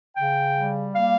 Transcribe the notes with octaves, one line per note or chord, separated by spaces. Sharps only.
C#3 G5
G3
A#3 F5